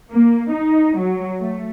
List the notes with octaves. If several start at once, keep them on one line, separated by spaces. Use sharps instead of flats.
A#3
D#4
F#3
A3